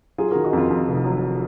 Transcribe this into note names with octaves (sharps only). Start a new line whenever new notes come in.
F#3 F4 G#4
F#4 A#4
D#3
D#4 F#4
F2 F4
F2
F1
F#3